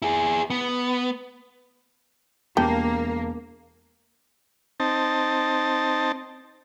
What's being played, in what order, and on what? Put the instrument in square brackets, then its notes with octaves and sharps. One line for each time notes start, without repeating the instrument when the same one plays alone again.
[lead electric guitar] E4 G#4
B3
[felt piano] E1 A5 [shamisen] G3 G5 [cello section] A#3
[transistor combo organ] C4 D#4 A5